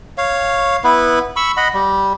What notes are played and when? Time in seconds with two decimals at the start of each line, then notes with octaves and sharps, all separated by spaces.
0.18 C#5 F5
0.84 B3 E4 B4
1.36 B5 C#6 E6
1.57 D#5 F#5 B5
1.74 G3